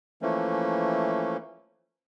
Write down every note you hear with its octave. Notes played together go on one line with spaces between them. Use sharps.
E3 F3 A3 A#3 C#4